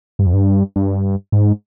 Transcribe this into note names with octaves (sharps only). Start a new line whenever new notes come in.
G2
F2
G2
G2
G#2